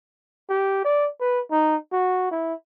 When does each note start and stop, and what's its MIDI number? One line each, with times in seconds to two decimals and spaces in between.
0.49 0.82 67
0.84 1.07 74
1.21 1.42 71
1.51 1.76 63
1.92 2.27 66
2.31 2.54 64